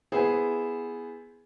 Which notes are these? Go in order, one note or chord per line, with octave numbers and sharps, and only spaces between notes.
B3 E4 G#4 C5